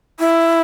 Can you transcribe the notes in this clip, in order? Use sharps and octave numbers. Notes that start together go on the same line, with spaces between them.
E4